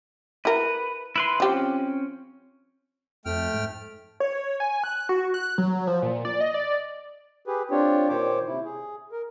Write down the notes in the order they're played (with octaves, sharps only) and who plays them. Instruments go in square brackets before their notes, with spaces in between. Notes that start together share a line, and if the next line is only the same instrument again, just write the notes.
[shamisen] E4 A#4 [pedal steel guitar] B4
[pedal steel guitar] E4 B4 C6
[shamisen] F3 G4 [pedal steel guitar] C4 C#4
[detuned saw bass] F2 [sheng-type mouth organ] A3 G5 F6
[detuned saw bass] G#2
[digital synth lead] C#5
G#5
F#6
F#4
F#6
F#3
F3
A#2
D5
D#5
D5
[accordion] G4 G#4 B4
C4 D4 F4 G4 C#5
A#2 D#3 C5 C#5 D6
C3 E4
G#4
A#4